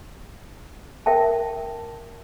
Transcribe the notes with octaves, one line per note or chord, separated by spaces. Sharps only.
A#4 E5 G5 A5